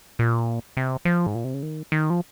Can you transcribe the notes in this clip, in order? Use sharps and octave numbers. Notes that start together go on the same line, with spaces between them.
A#2
C3
F3
G#2
A#2
C3
C#3
D#3
D#3
F3